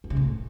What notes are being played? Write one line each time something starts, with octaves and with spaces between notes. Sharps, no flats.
F#2
C#3
A2